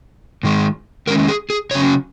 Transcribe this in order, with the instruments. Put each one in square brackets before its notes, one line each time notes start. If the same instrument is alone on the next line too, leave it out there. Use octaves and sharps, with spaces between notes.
[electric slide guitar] G#2 D#3 G#3
D#3 G#3 C#4 A#4
G#4
G#4
C#3 F#3 C#4 C#5